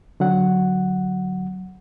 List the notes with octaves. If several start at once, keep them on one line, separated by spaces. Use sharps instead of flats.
D3 F#3 F#5